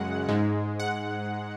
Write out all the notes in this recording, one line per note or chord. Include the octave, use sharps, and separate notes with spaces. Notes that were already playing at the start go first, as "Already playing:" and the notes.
Already playing: F#2 C#3 G#3 F#5
G#2 G#3
F#5